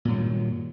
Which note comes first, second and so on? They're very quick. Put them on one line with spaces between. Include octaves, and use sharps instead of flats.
A#2 G2 F#3 D#3